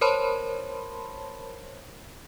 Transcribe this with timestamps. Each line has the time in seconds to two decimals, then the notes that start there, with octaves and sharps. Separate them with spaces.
0.01 A#4 C5 C#5 A5 B5 C6